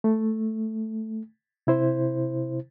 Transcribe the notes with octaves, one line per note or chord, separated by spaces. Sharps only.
A3
C3 E4 C5